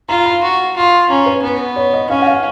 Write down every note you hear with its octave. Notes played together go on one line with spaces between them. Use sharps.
F4 A#5
B5
F#4
F4
C#4 A#5
B4
B3
C#5
D#5
C#4 F5
F#5
F5